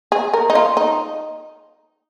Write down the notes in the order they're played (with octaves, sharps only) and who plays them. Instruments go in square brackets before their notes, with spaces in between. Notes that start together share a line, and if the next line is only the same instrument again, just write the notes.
[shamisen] G#4
A#4
D#4
F4
D#4